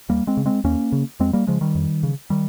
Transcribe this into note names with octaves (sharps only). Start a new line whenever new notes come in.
D#2 G3 A#3
G#3 C4
C#3
G#3 C4
D#2 A#3 C#4
C#3
F2 G#3 C4
G3 A#3
C#3 F3 G#3
D#3 G3
F2
C#3
D#3 G3